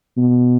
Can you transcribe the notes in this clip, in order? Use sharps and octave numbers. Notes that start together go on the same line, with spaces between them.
B2